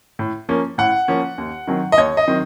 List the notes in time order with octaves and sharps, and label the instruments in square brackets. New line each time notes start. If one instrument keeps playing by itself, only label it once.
[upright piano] A2
F3 A#3 C#4
A2 F#5
F3 A#3 C#4
D#2
D#3 F#3 C4
D#5
D#2 C#5
D#5
D#3 F#3 C4